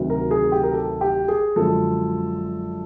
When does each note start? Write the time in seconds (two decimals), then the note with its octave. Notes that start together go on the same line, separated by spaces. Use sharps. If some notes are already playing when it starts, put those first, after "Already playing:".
Already playing: D2 C3 D#3 F#3
0.10 A#4
0.31 G#4
0.52 G4
0.63 A#4
0.73 A4
1.01 G4
1.28 G#4
1.56 F#2 D3 F3 G#3 A4